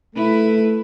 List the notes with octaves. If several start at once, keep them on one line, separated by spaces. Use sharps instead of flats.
A3 E4 B4